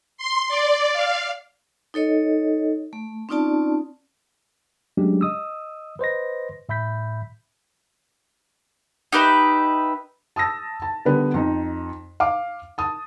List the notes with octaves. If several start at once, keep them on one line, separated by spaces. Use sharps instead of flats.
C6
D5
F5
D#4 A4 C#5 D#5
A3
C4 C#4 D#4 F4 D5 A5
F#3 G#3 A3 C#4 D4 G4
D#5 D#6 E6
B4 C5 D#5 A#6
A2 E5 B5 G6 B6
D#4 G4 B4 E5
A5 D#6 E6 A#6
A5
D3 G3 B3 B4
F2 D#4
F5 D6
A5 D#6